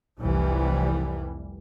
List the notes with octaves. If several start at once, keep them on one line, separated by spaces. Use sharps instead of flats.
F1 C2 E3 G3